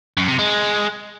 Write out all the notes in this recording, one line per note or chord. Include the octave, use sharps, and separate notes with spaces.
F#2
C3
G#3